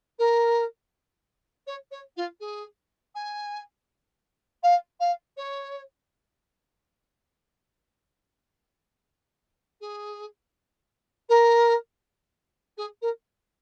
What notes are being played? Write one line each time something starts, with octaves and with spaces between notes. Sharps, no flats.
A#4
C#5
C#5
F4
G#4
G#5
F5
F5
C#5
G#4
A#4
G#4
A#4